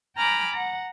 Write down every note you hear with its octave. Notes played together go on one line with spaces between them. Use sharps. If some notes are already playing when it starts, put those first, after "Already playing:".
G5 G#5 A#5 B5 D6 F6
F#5 A#5